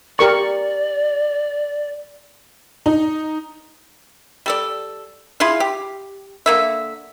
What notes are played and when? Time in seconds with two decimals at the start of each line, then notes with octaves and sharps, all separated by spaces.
0.19 G4 A#4 D5 C#6
2.86 D#4
4.46 G3 A4 D5
5.40 E4 F4 G#4 F5
5.60 G4
6.46 D3 A#3 E5